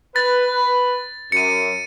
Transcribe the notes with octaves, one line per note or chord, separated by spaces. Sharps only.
B4 A6
F#2 C#7 D#7